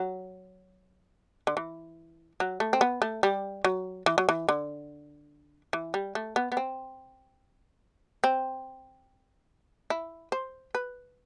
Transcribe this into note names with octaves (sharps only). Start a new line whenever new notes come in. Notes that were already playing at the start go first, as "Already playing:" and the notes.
Already playing: F#3
D3
E3
F#3
A3
C4
B3
A3
G3
F#3
E3
F#3
E3
D3
E3
G3
A3
B3
B3
C4
C4
E4
C5
B4